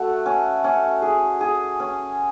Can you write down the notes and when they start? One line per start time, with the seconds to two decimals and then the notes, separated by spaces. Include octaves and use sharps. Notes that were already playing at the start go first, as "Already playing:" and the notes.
Already playing: A3 F#4
0.26 C#4
0.64 C#4
1.02 G#4
1.41 G#4
1.80 C#4